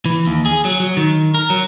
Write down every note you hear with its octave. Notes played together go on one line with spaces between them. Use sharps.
E3
D#2
G#4
F#3
F#3
D#3
A#4
F#3